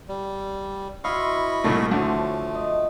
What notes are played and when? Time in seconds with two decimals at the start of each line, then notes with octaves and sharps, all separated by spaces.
0.08 G3
1.04 E4 F#4 C5 D#5 F5 B5 C#6
1.64 C2 A#2 A3
1.91 D2 D3 F3 F#3 A3 D4
2.55 D#5